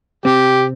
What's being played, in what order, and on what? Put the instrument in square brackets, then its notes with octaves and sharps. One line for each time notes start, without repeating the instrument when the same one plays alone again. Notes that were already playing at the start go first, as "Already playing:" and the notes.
[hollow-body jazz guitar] C3 C4 [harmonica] G4